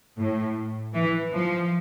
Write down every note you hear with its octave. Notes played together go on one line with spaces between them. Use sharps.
A2
E3
F3